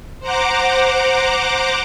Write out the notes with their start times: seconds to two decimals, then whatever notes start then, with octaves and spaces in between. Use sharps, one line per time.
0.20 C5 F#5 A#5 D6